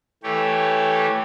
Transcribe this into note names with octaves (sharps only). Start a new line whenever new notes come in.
E3 A3 G4 C#5